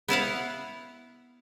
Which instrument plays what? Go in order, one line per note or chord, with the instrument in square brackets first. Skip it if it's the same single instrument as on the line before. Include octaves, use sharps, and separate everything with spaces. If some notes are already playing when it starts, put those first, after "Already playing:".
[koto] B3 E4 F5 F#5